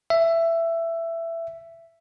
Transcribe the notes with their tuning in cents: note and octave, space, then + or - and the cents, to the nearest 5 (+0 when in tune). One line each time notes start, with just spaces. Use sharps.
E5 +15